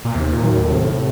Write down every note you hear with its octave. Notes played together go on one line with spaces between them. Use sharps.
A#2
D#2 C3
A#2
D#3 F#3
A2
C3